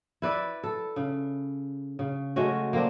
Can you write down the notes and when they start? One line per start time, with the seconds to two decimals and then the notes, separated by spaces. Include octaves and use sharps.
0.22 E4 B4 D5 E5
0.63 A4
0.96 C#3
1.99 C#3
2.36 G#3 A3 C#4 F#4
2.73 A#3 C4 D4